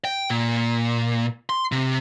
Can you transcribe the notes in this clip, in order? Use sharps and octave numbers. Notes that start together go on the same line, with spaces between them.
G5
A#2
C6
C3